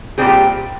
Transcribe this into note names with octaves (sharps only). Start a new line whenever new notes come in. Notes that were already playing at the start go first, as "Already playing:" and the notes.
A#2 G3 C4 G#4
G4